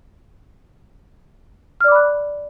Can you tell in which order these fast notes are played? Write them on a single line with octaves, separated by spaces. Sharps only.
F6 D5 D6 B5 F#6